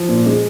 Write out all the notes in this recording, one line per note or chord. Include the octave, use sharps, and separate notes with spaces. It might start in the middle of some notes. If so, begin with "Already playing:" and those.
Already playing: F3
A#2
G#3